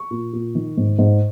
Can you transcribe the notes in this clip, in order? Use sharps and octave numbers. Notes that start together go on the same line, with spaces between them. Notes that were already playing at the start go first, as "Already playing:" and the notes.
Already playing: C#6
A#2
A#2
D#3
G#2
G#2